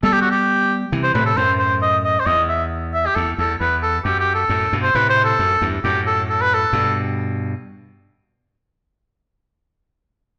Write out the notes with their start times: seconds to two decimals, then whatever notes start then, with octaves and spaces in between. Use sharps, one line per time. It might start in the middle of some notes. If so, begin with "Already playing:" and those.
0.03 G3 B3 A4
0.13 G4
0.21 F#4
0.31 G4
0.92 C3 E3
1.04 C5
1.15 A2 C3 B4
1.26 A4
1.37 F#2 A2 C5
1.59 C5
1.82 D#5
2.04 D#5
2.19 C5
2.26 E2 D#5
2.49 E5
2.94 E5
3.06 G4
3.15 E2 A4
3.38 E2 A4
3.61 E2 B4
3.83 A4
4.05 F#2 G4
4.20 G4
4.34 A4
4.49 F#2 A2
4.73 G2 B2
4.83 C5
4.95 A2 C3 B4
5.10 C5
5.24 A4
5.39 F#2
5.62 E2 G2
5.84 F#2 A2 G4
6.06 A4
6.29 A4
6.41 B4
6.54 A4
6.73 G2 B2